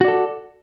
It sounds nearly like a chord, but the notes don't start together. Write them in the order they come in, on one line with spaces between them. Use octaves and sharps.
F#4 D5 A4